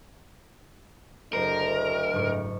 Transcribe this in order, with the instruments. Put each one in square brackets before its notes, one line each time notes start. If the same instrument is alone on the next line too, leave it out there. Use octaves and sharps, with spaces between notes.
[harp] F#1 C4 C5 [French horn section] D2 D#5 [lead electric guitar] A#4
[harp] F#1 G#2 C#6